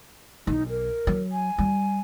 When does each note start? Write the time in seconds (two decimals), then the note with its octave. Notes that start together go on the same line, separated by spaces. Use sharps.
0.47 B1 D#4
0.69 A#4
1.07 F#3
1.32 G#5
1.58 G3